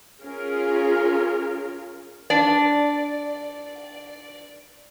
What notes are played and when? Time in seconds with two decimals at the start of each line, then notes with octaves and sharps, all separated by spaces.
0.22 C#4 F4 G#4 A#4
2.30 D4 D5